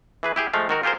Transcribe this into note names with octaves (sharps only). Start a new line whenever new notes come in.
E3 G#4 B4
E4 G4 G#4
F3 G#3 A3 F5
D#3 F#4 A#4
F4 G4 G#4 A#4 C5